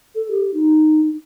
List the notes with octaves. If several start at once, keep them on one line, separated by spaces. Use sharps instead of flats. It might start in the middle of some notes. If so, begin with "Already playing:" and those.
A4
G4
D#4